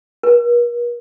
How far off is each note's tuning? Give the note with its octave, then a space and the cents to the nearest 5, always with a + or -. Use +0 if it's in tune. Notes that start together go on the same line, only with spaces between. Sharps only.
A#4 +45